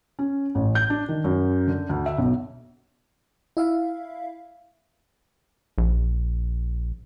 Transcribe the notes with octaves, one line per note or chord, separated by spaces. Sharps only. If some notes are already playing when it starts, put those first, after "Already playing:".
C#4
A1
G6
D4
D#3
F#2
D3
D2
E5
B1
E4 E5 F5
A#1